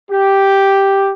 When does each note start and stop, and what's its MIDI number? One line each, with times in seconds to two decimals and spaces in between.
0.11 1.13 67